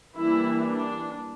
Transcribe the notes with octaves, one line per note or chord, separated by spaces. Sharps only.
E3 G3 A#3 D4 E4
D4